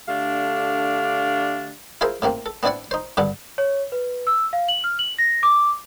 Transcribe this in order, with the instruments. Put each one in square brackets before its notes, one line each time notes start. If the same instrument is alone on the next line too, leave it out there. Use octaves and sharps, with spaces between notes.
[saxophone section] D3 A3 D4 G4 F5
[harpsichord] E4 F4 G#4 A#4 C5 E5
A2 C3 A#3 C4
A4
B3 C4 D4 E4 D5 F#5
D#4 C5
G2 D3 B3 D4 A4
[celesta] C#5
B4
E6
F5
F#7
F6
F#7
A#6
D6